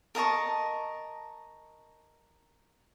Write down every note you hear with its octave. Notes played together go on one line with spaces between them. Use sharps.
A#4 D#5 A5 C#6